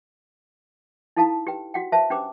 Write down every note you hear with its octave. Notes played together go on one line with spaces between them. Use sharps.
D#4 E4 A4 F5 A5 B5
G4 B4 G5
F#4 F#5 G5
B4 C5 E5 F5 A5
C#4 D4 G4 B4 C5 D6